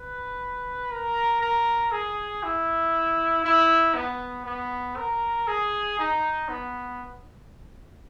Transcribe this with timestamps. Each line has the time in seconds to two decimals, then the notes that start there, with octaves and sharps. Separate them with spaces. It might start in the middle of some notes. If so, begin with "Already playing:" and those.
Already playing: B4
0.92 A#4
1.42 A#4
1.92 G#4
2.43 E4
3.44 E4
3.95 B3
4.45 B3
4.97 A#4
5.47 G#4
5.99 D#4
6.49 B3